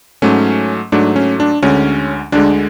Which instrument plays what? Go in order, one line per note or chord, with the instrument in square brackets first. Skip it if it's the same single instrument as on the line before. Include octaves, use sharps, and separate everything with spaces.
[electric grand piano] G#2 F#3 A3 C#4
G#2 F#3 A3 D4
C#4
D4
D2 D3 G#3 C#4
D2 D3 G#3 D4